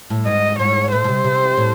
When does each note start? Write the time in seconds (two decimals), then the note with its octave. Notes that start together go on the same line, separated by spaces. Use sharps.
0.10 A2
0.27 G#2 D#5
0.59 G#2 C#5
0.92 A2 C5
1.04 A2
1.08 C3
1.24 C3
1.57 A2